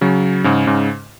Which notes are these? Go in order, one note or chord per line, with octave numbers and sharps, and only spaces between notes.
C#3 F#3
G#2 C#3
G#2 C#3